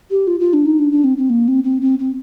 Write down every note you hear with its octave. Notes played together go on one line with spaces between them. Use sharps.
G4
F4
F4
D4
D#4
D4
D4
C4
C4
A#3
C4
C4
C4
C4